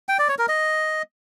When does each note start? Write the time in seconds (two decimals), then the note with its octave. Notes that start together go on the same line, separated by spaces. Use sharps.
0.09 G5
0.19 D5
0.29 C#5
0.39 A#4
0.49 D#5